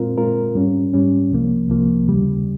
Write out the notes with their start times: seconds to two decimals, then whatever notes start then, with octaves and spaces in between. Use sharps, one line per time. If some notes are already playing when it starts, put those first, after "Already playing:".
Already playing: A#2 G#3 C4 F4 A#4
0.18 A#2 G#3 C4 F4 A#4
0.55 G#2 G3 C#4
0.93 G#2 G3 C#4
1.31 C2 C3 F3 A#3
1.69 C2 C3 F3 A#3
2.07 D#2 C#3 G3